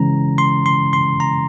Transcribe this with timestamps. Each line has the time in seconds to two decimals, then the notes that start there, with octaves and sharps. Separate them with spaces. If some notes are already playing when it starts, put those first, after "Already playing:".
Already playing: C#3 E3 G#3 C#4 A#5
0.38 C6
0.66 C6
0.93 C6
1.20 A#5